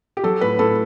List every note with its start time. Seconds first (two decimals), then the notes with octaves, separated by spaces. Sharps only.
0.17 G4
0.24 F#3 A4
0.41 A2 B4
0.59 A2 A4